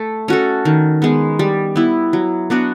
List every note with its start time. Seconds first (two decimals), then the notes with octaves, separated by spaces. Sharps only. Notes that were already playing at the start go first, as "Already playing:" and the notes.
Already playing: A3
0.28 C#4 F#4 A4
0.65 D#3
1.02 G#3 B3
1.39 G3
1.76 B3 E4
2.13 F#3
2.50 B3 D4 F#4